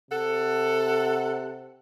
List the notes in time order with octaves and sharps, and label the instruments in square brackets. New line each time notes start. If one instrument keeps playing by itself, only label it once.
[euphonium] C3 [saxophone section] A4 F#5